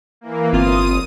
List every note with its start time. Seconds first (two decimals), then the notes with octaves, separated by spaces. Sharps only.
0.21 E3 A#3
0.53 G1 C4 F4 D#6 D#7